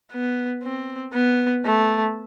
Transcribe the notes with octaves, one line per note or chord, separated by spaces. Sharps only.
B3
C4
B3
A3